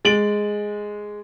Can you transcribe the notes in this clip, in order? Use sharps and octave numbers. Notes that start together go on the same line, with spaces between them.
G#3 A6 D7 F#7